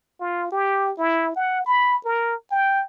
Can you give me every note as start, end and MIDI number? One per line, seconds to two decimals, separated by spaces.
0.20 0.47 65
0.52 0.92 67
0.98 1.33 64
1.35 1.65 78
1.66 1.99 83
2.05 2.35 70
2.51 2.83 79